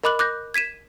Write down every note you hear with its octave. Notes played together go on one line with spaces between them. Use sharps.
A#4 D#5 B5 D6 F#6 F#7
D6 F#6 G6 A#6
G#6 B6 D#7 E7